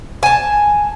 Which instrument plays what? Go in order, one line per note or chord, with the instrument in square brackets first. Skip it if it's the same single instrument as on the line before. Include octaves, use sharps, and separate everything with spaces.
[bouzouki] G#5 A5